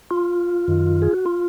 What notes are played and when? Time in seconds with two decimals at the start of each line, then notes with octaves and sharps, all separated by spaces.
0.11 F4
0.68 F#2 D#3
1.02 G#4
1.13 F#4
1.26 F4